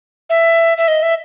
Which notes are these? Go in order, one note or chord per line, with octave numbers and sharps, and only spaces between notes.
E5
E5
D#5
E5